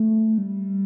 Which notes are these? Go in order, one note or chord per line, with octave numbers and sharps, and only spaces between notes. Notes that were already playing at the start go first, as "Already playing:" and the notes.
Already playing: A3
G3